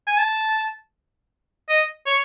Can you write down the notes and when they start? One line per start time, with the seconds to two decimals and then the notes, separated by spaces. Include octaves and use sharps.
0.07 G#5
0.19 A5
1.69 D#5
2.07 C#5